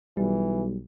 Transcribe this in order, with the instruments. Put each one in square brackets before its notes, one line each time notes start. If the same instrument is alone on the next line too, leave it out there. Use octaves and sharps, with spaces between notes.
[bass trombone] B1 [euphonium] E3 [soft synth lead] G3